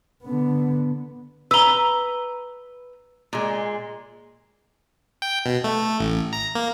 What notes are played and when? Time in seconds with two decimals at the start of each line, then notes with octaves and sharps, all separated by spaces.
0.23 D3 B3
1.51 B4 A#5 E6 G7
3.33 A#2 G#3
5.22 G5
5.46 B2
5.64 A3
6.00 A1
6.33 A#5
6.55 A#3